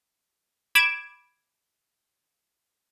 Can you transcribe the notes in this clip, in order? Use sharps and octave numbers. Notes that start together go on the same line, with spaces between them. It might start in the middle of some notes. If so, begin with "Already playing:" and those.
B5 D6 G#6 D7 E7